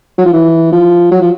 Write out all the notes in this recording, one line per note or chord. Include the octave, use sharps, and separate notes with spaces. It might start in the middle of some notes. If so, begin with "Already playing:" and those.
F#3
F3
E3
F3
F#3
F3